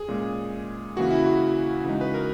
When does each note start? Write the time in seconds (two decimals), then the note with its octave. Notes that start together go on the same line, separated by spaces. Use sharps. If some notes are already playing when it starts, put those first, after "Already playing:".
Already playing: G#4
0.08 A#2 G#3 C#4
0.96 C#3 E3 A#3 F#4
1.11 E4
1.26 F#4
1.84 C#3 E3 G#3 D#4
2.01 B4
2.14 A#4